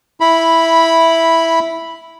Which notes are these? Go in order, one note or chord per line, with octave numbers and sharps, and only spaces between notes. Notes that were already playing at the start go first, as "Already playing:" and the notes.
E4 B5